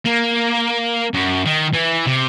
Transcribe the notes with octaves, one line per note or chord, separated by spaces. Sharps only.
A#3
F#2
D#3
E3
C3